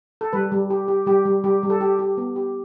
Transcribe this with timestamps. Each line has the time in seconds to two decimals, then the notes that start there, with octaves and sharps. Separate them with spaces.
0.21 A4
0.33 G3 B4
0.52 G3
0.70 G4
0.88 G4
1.06 G3 G4
1.25 G3
1.44 G3 G4
1.63 G3
1.70 A4
1.81 G4
1.99 G4
2.18 B3
2.36 G4